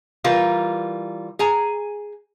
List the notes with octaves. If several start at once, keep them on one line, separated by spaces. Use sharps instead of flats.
E3 G3 F4 A#4 B4
G#4 G#5 A#5